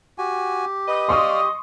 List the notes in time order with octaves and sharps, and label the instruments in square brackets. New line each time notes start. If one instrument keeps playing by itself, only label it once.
[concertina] F#4 G#5 [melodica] G4
[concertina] B4 [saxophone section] D#5
[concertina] D5 F5 [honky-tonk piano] C6 C#6 D#6